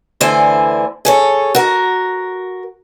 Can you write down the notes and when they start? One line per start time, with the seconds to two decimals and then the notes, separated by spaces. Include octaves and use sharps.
0.21 D2 D3 E3 E4 C5 G#5
1.05 G#4 A4 C#5
1.55 F#4 A#4